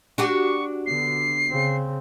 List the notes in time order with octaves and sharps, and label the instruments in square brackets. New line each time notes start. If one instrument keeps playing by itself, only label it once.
[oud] D4 F#4 G4 [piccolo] C#6
[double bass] D3 B3 [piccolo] C7
[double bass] C#3 C4